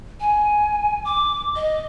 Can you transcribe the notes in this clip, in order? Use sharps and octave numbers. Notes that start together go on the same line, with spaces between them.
G#5
D6
D#5